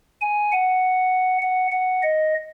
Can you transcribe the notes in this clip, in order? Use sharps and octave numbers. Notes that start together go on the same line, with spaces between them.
G#5
F#5
F#5
F#5
D#5